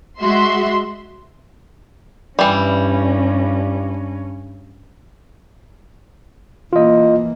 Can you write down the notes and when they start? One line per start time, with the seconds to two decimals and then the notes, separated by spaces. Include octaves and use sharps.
0.21 G#3 F#4 E5 C6
2.39 G2 E3 G3 C#4
6.73 E3 A#3 F4 D#5